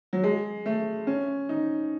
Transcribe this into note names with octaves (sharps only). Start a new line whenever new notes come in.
F#3
G#3
A3
C#4
D#4